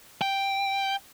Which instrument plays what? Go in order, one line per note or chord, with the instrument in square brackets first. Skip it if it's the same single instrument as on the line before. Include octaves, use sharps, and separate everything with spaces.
[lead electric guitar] G5